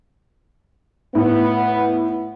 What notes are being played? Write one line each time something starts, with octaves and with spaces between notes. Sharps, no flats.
A2 B3